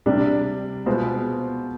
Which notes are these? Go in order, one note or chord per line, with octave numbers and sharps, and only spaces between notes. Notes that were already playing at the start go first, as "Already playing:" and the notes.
C3 G3 D4
B2 G#3 B3 F4 C5